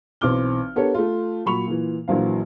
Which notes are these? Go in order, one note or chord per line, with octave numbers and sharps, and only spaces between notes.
B1 E3 C4 D6 F6 G7
B3 D4 G4 A4 A#4 C#5
A3 F4
A#2 F#3 B5 C#6 F7
A#2 E3
A#1 E3 F#3 A#3 C5 F5